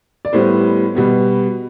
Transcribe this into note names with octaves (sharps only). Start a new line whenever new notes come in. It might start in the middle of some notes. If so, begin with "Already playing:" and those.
D5
A2 G3 B3 C5
B2 G3 B3